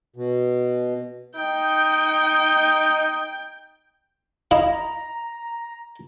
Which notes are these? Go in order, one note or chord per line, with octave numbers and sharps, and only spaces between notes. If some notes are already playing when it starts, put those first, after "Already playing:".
B2
D#4 G5
E4 D#5 F5 A#5